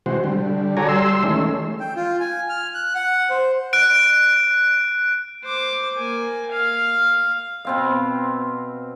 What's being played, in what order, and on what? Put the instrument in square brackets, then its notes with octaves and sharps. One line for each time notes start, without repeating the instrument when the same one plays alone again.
[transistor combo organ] C3 E3 G#3 F#4 C5
D3 G3
F#4 A4 C#5 D5 G#5 A#5
G3 C6 E6
D#3 E3 G#3 A3 C#4
[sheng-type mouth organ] G5
F4
G#5
F6
F#6
F#5
C5
[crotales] F#6 D7
[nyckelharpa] C5 D6
A#3 G#5
F5
[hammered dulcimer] B2 C4 F5